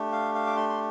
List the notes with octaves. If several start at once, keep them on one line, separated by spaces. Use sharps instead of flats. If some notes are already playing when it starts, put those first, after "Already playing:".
Already playing: A3 D4 G4
F5
F5
D6
C6
C6